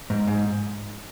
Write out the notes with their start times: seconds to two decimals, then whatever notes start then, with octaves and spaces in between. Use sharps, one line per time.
0.10 G#2
0.27 G#2